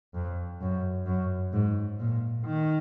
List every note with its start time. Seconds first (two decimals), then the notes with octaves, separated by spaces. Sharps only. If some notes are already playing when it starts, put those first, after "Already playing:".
0.14 F2
0.61 F#2
1.06 F#2
1.53 G#2
1.99 A#2
2.46 D#3